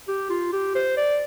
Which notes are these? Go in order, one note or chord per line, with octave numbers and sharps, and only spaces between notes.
G4
F4
G4
C5
D5